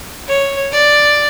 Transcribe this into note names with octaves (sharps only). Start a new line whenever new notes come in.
C#5
D5